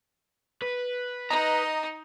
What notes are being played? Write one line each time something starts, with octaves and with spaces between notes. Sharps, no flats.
B4
D#4 D#5 A#5